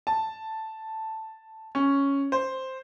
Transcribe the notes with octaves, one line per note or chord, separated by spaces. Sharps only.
A5
C#4
C5